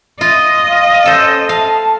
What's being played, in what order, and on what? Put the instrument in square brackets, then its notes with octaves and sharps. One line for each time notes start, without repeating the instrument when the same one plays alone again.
[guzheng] F4 [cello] D#5
[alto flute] F5
[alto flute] C#4 [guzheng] A4 C5
[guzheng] F5 [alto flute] A5